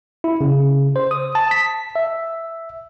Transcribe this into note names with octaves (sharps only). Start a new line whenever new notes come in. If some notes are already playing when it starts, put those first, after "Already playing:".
E4
C#3
C5
D#6
A5
B6
E5